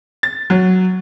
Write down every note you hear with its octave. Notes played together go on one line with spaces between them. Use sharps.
A6
F#3